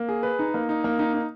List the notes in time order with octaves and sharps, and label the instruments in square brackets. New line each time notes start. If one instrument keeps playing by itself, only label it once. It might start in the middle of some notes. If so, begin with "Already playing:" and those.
Already playing: [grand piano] A#3
G#4
B4
D#4
A#3
D#4
A#3
D#4
D#4